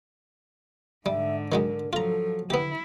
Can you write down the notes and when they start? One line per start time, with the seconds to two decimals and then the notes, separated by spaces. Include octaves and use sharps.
1.06 G#2 D3 G3 E5
1.52 D#3 F#3 G#3 A#4
1.93 F3 F#3 F4 A4 A#5
2.50 D3 B3 E4 G4